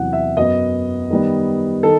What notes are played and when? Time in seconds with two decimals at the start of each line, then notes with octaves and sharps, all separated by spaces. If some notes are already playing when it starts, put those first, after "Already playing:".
Already playing: E2 C3 F#3 F#5
0.13 E5
0.37 F#2 F#3 B3 D#5
1.10 D#3 G3 B3
1.83 D#3 A4